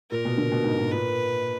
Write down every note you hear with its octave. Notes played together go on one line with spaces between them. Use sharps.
A#2 A#4
B2
D3
B2
G#2
G#2
A#2 B4